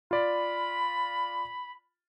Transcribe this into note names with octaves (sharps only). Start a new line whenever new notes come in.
F4 D5 B5